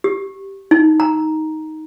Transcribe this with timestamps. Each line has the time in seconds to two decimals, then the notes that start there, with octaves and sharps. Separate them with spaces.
0.04 G4
0.71 D#4
1.00 A#5